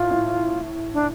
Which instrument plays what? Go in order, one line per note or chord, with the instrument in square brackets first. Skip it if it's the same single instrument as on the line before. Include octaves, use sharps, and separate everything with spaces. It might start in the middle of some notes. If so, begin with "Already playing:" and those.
Already playing: [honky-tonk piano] A2 [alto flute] F4
[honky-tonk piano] A2
[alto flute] D4